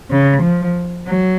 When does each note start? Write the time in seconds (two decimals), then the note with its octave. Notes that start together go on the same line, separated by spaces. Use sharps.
0.11 C#3
0.43 F3
1.08 F#3